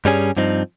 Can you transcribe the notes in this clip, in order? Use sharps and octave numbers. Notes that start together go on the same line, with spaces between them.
G2 G3 C#4 G#4
G2 F3 C4 D#4